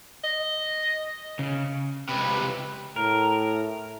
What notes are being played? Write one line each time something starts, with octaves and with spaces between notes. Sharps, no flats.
D#5
C#3
C#2 C3 B4
A2 A#4